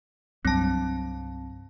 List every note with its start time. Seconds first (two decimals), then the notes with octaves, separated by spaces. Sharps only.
0.45 C2 G2 F#3 C4 A5